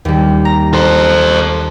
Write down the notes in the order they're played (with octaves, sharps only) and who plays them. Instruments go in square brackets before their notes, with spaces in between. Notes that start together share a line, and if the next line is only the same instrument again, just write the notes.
[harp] D#2 G3
A#5 A#6
[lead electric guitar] A4 C5